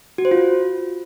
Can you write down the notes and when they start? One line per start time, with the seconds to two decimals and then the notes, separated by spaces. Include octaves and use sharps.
0.18 F#4
0.25 C5
0.31 F4